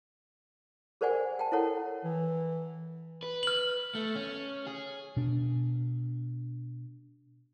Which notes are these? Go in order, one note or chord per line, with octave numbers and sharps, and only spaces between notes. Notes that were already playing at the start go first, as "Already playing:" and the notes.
G#4 A#4 C5 D5 F#5 G#5
G5 A5
E4 A4 A#4 C#5 F#5
E3
B4
F6 F#7
A3
C#4
G#4
B2 D4